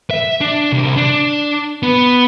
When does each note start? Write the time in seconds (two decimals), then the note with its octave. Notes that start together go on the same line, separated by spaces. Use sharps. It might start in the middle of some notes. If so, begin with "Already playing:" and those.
0.11 E5
0.41 D4
0.72 C2
0.97 D4
1.83 B3